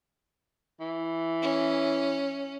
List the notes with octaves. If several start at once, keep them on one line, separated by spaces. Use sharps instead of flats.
E3
C#4